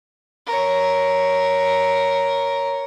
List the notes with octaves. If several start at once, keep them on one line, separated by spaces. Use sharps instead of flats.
A#4 C#5